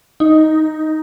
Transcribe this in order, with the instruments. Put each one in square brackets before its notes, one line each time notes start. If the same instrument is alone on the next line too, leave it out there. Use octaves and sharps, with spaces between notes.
[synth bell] D#4